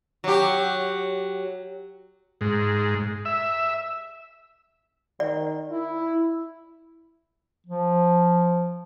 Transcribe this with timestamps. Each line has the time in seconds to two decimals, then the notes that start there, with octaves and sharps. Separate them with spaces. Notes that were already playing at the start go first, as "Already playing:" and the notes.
0.24 F#3 G4
2.41 G#2
3.25 E5
5.20 D#3 D5
5.71 E4
7.66 F3